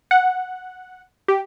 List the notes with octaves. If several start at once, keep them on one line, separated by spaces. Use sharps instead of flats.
F#5
G4